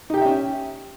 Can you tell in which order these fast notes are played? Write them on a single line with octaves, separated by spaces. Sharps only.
D#4 G4 G5 E5 C#4